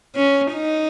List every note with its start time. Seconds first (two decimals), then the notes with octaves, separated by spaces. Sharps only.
0.15 C#4
0.53 D#4